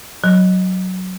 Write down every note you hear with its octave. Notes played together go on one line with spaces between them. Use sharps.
F#3